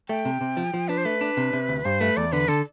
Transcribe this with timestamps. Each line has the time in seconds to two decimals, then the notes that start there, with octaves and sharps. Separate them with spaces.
0.09 A3 G5
0.25 C3
0.41 C3
0.57 F3
0.74 F3
0.89 D4 B4
0.98 C5
1.05 A3 B4
1.21 D4
1.37 C3
1.53 C3
1.69 D2
1.85 G2 C5
2.00 A3 B4
2.17 E2 D5
2.32 D3 B4
2.48 D3 A4